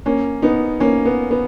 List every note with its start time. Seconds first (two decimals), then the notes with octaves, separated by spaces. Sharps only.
0.06 A#3 C#4
0.42 B3 D#4
0.80 A#3 C#4
1.06 B3
1.31 B3